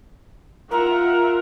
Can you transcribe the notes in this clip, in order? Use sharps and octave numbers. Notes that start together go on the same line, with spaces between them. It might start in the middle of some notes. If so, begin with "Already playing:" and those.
F4 A#4 E5 F#5